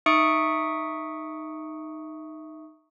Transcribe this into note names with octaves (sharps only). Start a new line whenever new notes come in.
D#4 E5 C#6 D#6 C#7 D7